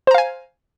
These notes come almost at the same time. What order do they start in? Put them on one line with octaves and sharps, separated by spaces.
C5 A#5 F5 G#5